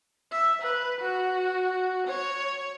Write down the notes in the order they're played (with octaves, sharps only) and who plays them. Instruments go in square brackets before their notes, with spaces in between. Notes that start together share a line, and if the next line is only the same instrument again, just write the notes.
[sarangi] E5
B4
F#4
C#5